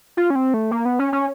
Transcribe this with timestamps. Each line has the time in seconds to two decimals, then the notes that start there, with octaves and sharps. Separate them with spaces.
0.17 F4
0.30 C#4
0.35 C4
0.54 A3
0.71 A#3
0.85 B3
0.99 C#4
1.13 C#4